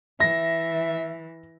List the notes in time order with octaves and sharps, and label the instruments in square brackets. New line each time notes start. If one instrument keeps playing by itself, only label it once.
[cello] E3 [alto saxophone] E5 [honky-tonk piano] A#6